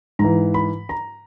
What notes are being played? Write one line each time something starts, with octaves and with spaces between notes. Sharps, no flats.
G#2 A#5
E3
B5
A#5